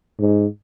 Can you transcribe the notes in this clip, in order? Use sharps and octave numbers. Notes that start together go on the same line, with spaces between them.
G#2